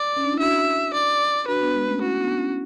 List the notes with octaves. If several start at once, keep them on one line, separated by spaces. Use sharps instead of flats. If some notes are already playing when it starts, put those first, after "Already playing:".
Already playing: D5
C#4
D4
E4
D4 F#4 E5
D5
D4 F#4 B4
B3 D4
G#3 B3
A3 C#4
C#4 E4 F#4
B3 D4
C#4 E4